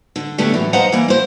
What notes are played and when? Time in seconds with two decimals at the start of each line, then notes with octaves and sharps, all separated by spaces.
0.16 D3
0.38 A#2 D3 A3 B3 C#4 G4
0.53 A2 E3 F#3
0.73 B4 C5 D#5 F5 F#5 A#5
0.92 E3 G3 A#3
1.08 E4 C5